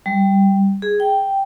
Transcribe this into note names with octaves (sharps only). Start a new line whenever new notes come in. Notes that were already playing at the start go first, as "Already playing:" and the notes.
G3
G#4
G5